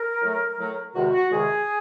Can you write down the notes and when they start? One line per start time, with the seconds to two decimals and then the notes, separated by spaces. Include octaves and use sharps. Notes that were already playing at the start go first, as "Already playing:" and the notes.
Already playing: A#4
0.22 A2 F#3 A3
0.58 A2 F#3 A3
0.93 E2 C3 D#3 G#3 F#4
1.12 F#4
1.30 E2 C3 D#3 G#3 G#4